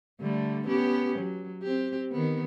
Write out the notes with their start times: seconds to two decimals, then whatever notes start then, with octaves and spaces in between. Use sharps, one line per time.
0.20 D3 G3 A3
0.67 B3 C#4 G4
1.19 F#3
1.63 C4 G4
2.12 D#3 B3